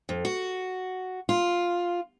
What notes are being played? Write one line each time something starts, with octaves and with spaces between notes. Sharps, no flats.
F2
F#4
F4